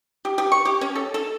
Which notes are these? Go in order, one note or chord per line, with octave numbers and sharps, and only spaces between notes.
G4
G4
C#6
G4
C#4
A4
A4